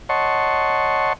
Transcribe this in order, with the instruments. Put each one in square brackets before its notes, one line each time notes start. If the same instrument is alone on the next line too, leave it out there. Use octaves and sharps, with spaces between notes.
[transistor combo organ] C#5 D#5 F#5 A5 C6 C#6